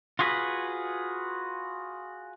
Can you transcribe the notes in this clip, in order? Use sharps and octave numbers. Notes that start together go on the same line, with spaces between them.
F4 F#4 G#4 B4